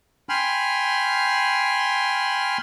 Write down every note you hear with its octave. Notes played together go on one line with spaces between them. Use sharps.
G5 G#5 B5 C6 F6